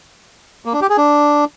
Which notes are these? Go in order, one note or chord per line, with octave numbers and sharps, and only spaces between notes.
A#3
D4
G4
G#4
D4